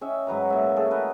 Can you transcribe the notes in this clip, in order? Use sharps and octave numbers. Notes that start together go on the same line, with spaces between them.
C#4 D#5 E5 G5
G#2 F#3 B4 A#5
A#2 E5
A3 F#4 G#4 A4
A#4 B4 D#5